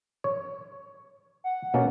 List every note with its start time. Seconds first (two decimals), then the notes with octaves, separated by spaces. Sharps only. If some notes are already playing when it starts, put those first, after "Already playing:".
0.24 C#5
1.44 F#5
1.74 B2 A#3 C#4